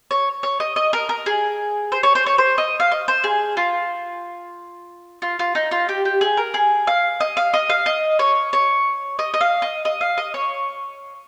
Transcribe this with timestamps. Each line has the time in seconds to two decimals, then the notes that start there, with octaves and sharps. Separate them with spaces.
0.11 C#5
0.43 C#5
0.60 D#5
0.76 D#5
0.93 A#4
1.09 A#4
1.26 G#4
1.92 C5
2.03 C#5
2.15 C5
2.26 C#5
2.38 C5
2.58 D#5
2.80 F5
2.91 D#5
3.08 C5
3.24 G#4
3.57 F4
5.22 F4
5.39 F4
5.55 D#4
5.71 F4
5.89 G4
6.05 G4
6.21 G#4
6.37 A#4
6.54 G#4
6.87 F5
7.20 D#5
7.37 F5
7.53 D#5
7.70 F5
7.86 D#5
8.19 C#5
8.53 C#5
9.19 D#5
9.34 D#5
9.41 F5
9.62 D#5
9.85 D#5
10.01 F5
10.18 D#5
10.34 C#5